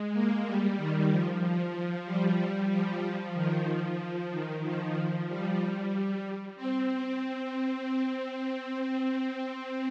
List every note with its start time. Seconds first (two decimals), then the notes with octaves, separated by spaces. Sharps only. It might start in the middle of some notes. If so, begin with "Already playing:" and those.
Already playing: G#3
0.13 A#3
0.46 G3
0.77 D#3
1.10 F3
1.42 F3
2.06 G3
2.38 G3
2.71 F3
3.02 F3
3.34 D#3
3.67 F3
4.31 D#3
4.63 F3
5.28 G3
6.56 C4